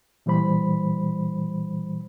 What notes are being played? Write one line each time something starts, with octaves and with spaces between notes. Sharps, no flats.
A#2 E3 G3 C5 B5